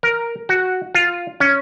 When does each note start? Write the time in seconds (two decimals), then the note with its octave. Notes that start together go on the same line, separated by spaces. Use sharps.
0.03 A#4
0.49 F#4
0.95 F4
1.40 C#4